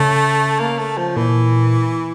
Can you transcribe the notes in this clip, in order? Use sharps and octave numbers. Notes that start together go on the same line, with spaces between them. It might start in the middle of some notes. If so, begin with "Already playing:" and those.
Already playing: C#3 A3
A#3
A3
F3
A#2 E3